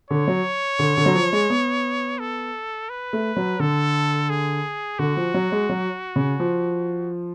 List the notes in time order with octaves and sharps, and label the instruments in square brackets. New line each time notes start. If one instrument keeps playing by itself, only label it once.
[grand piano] D3 [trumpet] C#5
[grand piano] F#3
D3
D3
F#3
F3
G#3
B3
[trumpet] A4
B4
[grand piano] A3
F#3
[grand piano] D3 [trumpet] A4
[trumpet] G#4
[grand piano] D3 [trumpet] F#4
[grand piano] F3
F#3
G#3
F#3
C#3
F3